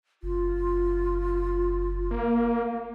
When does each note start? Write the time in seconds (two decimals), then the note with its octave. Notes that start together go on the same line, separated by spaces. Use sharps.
0.23 F#1 F4
2.11 A#3